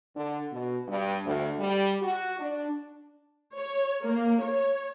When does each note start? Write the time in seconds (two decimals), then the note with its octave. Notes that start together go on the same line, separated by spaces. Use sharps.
0.15 D3
0.52 B2
0.88 G2
1.25 D2
1.59 G3
2.02 F#4
2.38 D4
3.57 C#5
4.03 A#3
4.41 C#5